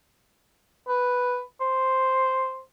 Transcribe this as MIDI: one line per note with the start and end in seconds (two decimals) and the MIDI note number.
0.88 1.41 71
1.61 2.61 72